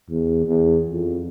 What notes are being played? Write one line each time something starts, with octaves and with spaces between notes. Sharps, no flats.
E2
E2
F2